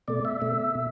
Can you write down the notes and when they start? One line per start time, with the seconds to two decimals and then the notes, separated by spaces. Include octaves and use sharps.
0.08 B2 A3 D5
0.25 E5
0.40 B2 A3 E5
0.75 B2